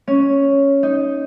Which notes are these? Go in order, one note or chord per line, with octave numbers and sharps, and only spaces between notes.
C#4
D#4